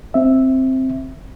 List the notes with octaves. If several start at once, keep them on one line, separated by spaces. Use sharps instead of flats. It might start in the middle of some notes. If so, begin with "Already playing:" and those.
C4 E5